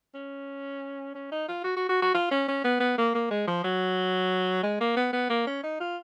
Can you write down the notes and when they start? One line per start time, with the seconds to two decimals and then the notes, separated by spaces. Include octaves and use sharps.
0.15 C#4
1.15 C#4
1.32 D#4
1.48 F4
1.64 F#4
1.77 F#4
1.89 F#4
2.02 F#4
2.14 F4
2.31 C#4
2.48 C#4
2.64 B3
2.80 B3
2.98 A#3
3.15 A#3
3.31 G#3
3.47 F3
3.64 F#3
4.63 G#3
4.81 A#3
4.96 B3
5.13 B3
5.30 A#3
5.47 C#4
5.63 D#4
5.80 F4